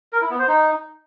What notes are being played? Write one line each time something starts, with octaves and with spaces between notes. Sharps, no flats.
A#4
E4
B3
C5
D#4